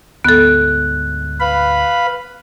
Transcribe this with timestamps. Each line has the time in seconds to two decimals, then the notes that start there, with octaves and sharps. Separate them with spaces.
0.24 D2 G#2 B3 A4 F#6
1.40 B4 F5 B5